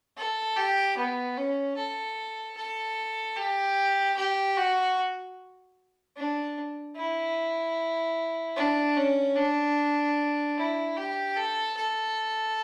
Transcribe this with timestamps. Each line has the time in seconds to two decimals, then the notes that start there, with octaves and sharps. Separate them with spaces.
0.17 A4
0.57 G4
0.97 B3
1.37 C#4
1.76 A4
2.57 A4
3.36 G4
4.17 G4
4.57 F#4
6.16 D4
6.97 E4
8.56 D4
8.97 C#4
9.36 D4
10.56 E4
10.97 G4
11.36 A4
11.77 A4